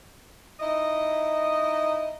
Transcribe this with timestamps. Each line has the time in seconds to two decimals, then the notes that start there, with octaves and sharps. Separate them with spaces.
0.60 D#4 E4 D#5